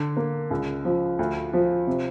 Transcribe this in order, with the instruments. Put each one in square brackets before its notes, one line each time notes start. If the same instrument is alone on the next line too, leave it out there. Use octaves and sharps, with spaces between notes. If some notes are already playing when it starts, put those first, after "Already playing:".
Already playing: [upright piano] D3
A#3
C#2
F3
D2
F3
C3